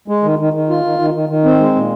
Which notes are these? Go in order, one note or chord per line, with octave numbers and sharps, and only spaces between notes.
G#3
D#3
D#3
D#3
F4
D#3
D#3
D#3
D#3
C4
G#3
A#2